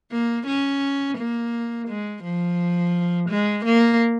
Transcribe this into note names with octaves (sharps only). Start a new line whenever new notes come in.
A#3
C#4
A#3
G#3
F3
G#3
A#3